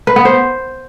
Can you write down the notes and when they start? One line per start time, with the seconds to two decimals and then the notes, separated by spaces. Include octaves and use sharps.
0.07 B4
0.16 B3
0.25 C5